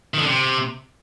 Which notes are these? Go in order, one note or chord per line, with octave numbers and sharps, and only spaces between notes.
D#3
D3
C3